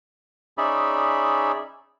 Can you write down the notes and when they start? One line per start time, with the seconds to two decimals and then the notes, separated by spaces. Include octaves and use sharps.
0.58 C#4 D#4 G#4 D5 E5 B5